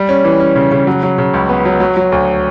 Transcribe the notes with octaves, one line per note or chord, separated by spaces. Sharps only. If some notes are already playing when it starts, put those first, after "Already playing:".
Already playing: G3
C#4
E3
C#4
C#3
C#3
F#3
F#3
C#3
C#2
B3
F#3
F#3
F#3
D2